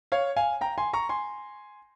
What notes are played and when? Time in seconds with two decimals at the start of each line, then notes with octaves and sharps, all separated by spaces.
0.12 C#5 F5
0.37 F5 G#5
0.61 G5 A#5
0.78 G#5 C6
0.93 A#5 C#6
1.09 G#5 C6